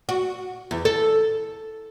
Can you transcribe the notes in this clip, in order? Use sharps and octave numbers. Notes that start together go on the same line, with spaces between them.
F#4
E2
A4